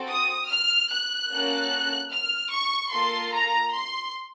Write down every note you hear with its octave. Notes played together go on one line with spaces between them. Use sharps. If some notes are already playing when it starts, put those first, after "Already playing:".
Already playing: C4 F#4 A4
D#6
F6
F#6
A#3 C#4 F#4 A4
F6
C#6
A#3 F4 A4 C6
A#5
C6